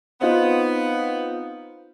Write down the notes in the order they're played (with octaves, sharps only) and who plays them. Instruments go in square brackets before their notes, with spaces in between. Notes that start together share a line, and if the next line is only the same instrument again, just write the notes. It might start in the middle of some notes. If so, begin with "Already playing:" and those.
[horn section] B3 [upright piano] C4 D#4 F4